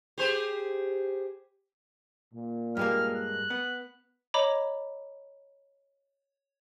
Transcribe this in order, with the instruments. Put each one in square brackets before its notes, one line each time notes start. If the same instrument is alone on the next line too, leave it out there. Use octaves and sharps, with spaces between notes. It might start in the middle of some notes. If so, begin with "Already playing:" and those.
[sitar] G4 G#4 C5
[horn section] A#2
[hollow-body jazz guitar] G2 G#3 A#3 [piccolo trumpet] F6
[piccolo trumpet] F#6
[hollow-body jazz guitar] B3
[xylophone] C#5 D#5 A#5 B5 D6